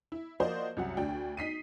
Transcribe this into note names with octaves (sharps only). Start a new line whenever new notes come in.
E4
F3 A#3 F#4 C5 D5 D#5
C2 F#2 F#5
D2 D4 G5
D#4 B6 C7 D#7